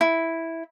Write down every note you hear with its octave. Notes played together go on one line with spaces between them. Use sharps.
E4